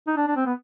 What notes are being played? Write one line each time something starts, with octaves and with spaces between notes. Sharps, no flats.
D#4
D4
D4
C4
B3